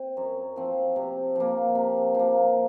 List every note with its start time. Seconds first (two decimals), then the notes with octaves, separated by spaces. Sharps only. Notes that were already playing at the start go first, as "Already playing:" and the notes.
Already playing: C4
0.17 F#2
0.56 F3 C4
0.96 C3
1.36 F3 A#3
1.75 C3
2.15 F3 A#3